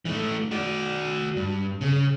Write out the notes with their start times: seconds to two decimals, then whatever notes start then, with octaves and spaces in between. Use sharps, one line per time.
0.05 E3 A3
0.51 F#4 D5
1.37 G2
1.81 C#3